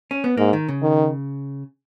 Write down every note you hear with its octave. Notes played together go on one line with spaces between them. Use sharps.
C#4
B3
G#2 A#3
D#3
C#3
D#3